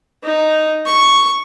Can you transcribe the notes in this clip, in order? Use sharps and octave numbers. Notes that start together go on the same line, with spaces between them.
D#4
C#6